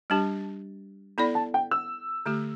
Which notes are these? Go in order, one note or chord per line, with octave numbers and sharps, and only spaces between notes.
G3 D4 G4 A5
B3 E4 A4 D5 B5
A5
G5
E6
D3 A3 G4